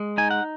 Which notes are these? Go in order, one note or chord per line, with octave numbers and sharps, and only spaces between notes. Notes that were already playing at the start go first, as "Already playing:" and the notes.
Already playing: G#3
D#4 G#5
F#5